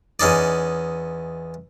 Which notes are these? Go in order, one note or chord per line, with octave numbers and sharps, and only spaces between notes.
E2 C#4 D#4 D5